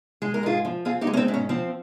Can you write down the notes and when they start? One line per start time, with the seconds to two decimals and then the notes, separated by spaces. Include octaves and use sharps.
0.22 G#3 G#4
0.34 A#4
0.43 G#2 F4 G#4
0.65 F3
0.85 C4 F4 G#4
1.01 D#4 G4
1.07 G#3
1.13 C#4
1.17 C4 D#4
1.28 G#2
1.34 C#4
1.49 F3 C4